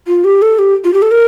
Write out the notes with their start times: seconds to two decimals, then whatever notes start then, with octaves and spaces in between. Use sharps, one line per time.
0.07 F4
0.24 G4
0.42 A4
0.59 G4
0.84 F4
0.94 G4
1.02 A4
1.11 A#4